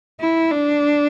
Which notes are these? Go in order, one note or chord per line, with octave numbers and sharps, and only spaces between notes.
E4
D4